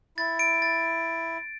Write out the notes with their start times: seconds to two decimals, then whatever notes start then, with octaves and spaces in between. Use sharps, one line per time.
0.18 E4 A6
0.39 D7
0.62 A6